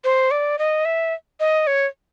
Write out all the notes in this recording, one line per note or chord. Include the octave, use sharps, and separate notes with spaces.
C5
D5
D#5
E5
D#5
C#5